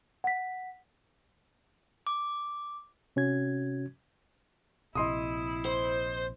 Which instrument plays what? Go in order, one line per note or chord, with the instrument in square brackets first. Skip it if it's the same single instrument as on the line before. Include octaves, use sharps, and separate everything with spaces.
[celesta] F#5 B6
[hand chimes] D6
[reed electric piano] C3 C#4 F#4 G#6
[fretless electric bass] A#1 C3 [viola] E4 [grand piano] D#5 C6 D#6
[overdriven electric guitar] C5